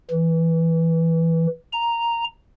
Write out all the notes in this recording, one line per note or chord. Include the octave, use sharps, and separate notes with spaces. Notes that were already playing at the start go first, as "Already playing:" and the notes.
E3
A#5